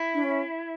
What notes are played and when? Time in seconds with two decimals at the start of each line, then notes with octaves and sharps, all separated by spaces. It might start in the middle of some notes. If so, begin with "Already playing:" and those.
Already playing: E4
0.14 D4
0.23 C#4